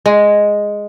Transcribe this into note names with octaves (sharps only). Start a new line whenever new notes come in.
G#3